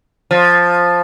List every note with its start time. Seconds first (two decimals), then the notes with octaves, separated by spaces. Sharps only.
0.31 F3